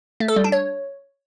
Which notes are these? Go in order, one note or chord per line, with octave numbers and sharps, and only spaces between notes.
A3
A4
G3
D4
C#5